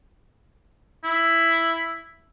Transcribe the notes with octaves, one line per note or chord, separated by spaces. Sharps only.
E4